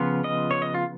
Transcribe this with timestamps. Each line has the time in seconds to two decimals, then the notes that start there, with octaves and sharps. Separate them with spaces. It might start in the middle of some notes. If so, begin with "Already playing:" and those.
Already playing: C#3 F3 B3 F4
0.24 D#5
0.51 C#5
0.62 D#5
0.74 F4